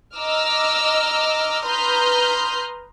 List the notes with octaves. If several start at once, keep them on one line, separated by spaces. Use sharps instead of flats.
D#5 A#5 D6 E6 F6
B4 A#5 C6 D#6 F6 G6